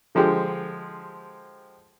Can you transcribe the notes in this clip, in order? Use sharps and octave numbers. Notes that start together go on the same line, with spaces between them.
D3 F3 G#3 G4